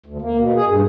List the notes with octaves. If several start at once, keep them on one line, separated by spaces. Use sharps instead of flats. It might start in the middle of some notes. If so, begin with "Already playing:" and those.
D2
A#3
B2
G#4
G2